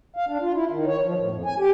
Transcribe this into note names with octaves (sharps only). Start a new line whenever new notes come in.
F5
D4
F4
E4
D#3
C#5
F3
A2
F2
G#5
G4